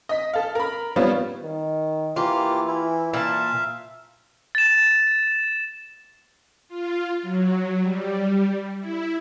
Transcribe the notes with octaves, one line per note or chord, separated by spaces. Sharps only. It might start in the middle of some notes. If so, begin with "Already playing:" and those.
D#5 B6
A4 F5
A#4 B5
G3 B3 C4 F4 C#5
D#3
E3 A#3 F4 G4
E4
A#2 E5 F5 A5
A6 E7
F4
F#3
G3
E4